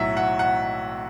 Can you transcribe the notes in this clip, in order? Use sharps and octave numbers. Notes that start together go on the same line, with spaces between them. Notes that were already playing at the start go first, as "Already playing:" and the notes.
Already playing: B1 A2 F#3 E5 F#5
F#5
F#5